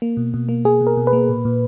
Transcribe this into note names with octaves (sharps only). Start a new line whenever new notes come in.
A#3
B2
B2
A#3
A#3 G#4
B2
A#4
B2
B4
A#3
A#2
A#2